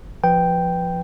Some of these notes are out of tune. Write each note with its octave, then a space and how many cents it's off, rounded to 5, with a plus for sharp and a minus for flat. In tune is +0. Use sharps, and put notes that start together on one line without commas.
F3 +0 B4 +0 G5 +0